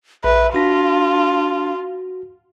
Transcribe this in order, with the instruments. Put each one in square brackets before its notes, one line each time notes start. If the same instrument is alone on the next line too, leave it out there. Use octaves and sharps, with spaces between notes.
[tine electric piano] A#1 [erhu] B4 [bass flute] E5
[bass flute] D4 [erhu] F4 [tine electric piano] F#4 A#6 B6